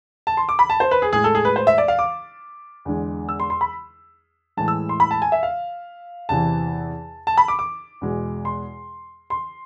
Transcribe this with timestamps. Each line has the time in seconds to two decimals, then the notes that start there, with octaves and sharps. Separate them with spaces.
0.27 A5
0.37 C6
0.49 D6
0.59 B5
0.70 A5
0.80 C5
0.91 B4
1.02 G#4
1.13 A2 G#3 G#4
1.24 A4
1.35 G#4
1.45 B4
1.56 C5
1.67 E5
1.78 D5
1.88 F5
1.99 D6
2.85 E2 D3 G#3
3.29 E6
3.40 C6
3.50 C6
3.61 B5
4.57 A2 E3 G#3 A5
4.68 E6
4.89 C6
5.00 B5
5.11 A5
5.22 G#5
5.32 E5
5.43 F5
6.29 E2 C3 E3 A5
7.27 A5
7.38 B5
7.48 D6
7.59 D6
8.01 E2 B2 G#3
8.45 C6
9.30 C6